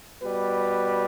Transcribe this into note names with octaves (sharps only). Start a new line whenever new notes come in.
B2 G3 B4